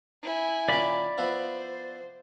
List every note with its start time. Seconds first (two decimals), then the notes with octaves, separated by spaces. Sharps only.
0.23 E4 G#5
0.69 A#2 D#3 C#4 D5 B5
1.18 F3 B3 E4 C5